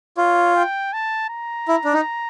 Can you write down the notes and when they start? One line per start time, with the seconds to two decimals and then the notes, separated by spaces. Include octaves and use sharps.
0.17 F4 C#5
0.56 G5
0.93 A5
1.30 A#5
1.68 E4
1.85 D4
1.93 D#4